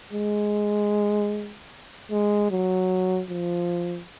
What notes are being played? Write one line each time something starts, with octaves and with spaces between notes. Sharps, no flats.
G#3
G#3
F#3
F3